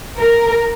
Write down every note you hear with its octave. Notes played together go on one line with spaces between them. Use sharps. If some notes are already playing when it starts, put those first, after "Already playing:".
A#4